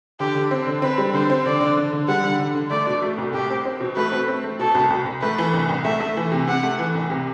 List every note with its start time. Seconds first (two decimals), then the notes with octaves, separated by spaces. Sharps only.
0.20 D3 G4
0.35 D3
0.51 C4
0.67 D3
0.82 C4 B4
0.98 G3
1.14 D3 C5
1.30 C4
1.46 D3 D5
1.61 D3
1.77 D3
1.93 D3
2.08 G3 F#5
2.24 D3
2.39 D3
2.55 D3
2.70 A3 D5
2.87 B2
3.02 A3
3.18 C2
3.34 C2 G4
3.50 C4
3.65 C4
3.80 B2
3.96 A3 B4
4.12 C4
4.28 C4
4.44 A3
4.59 B2 A4
4.75 C2
4.90 C2
5.06 C2
5.21 A3 B4
5.38 E3
5.53 C2
5.69 C2
5.84 A3 E5
6.00 A3
6.17 E3
6.32 C3
6.47 C3 F#5
6.63 A3
6.79 E3
6.95 C2
7.10 C3